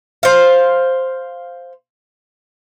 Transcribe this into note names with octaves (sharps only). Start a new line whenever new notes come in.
C5 F5